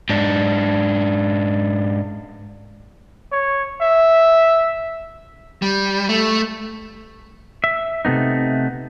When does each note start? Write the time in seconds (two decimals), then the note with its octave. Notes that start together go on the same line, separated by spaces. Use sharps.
0.09 G#2 D4
3.32 C#5
3.81 E5
5.62 G3
6.09 A3
7.64 E5
8.05 C3 A3 B3 D#4